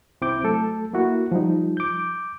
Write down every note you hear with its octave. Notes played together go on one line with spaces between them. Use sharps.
C2 C4 E4 D6 G6
F#3 A3 A4
A#3 E4 F#4
F3 G3 D#4
D6 G6